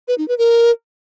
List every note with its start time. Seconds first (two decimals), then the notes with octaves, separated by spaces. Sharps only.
0.08 B4
0.18 D#4
0.28 B4
0.38 A#4